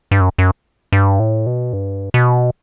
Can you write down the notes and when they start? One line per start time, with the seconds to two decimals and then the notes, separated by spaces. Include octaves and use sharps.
0.11 G2
0.21 F#2
0.38 F#2
0.92 G2
1.20 A2
1.46 B2
1.73 G2
2.14 B2